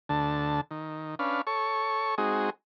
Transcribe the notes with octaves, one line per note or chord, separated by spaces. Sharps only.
D2 D3 A5
D#3
C#4 D4 B4 F5
A4 C#5 C#6
G#3 C4 D#4 F#4 G#4